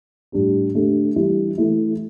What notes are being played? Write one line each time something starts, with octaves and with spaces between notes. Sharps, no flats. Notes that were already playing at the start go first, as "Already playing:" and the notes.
A2 G3 D4 G4
D3 A3 D4 G4
E3 G3 E4 G4
E3 A3 E4